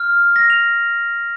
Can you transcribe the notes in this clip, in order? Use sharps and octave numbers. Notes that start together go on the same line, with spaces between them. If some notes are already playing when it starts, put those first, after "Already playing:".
Already playing: F6
A#6
F7